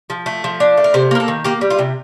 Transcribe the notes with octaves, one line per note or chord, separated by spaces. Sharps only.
F3
A3
F3
D4
A3
A#4
C3 C5
A#3 A#4
A4
D#3
A#3 G4
G3
F4
C3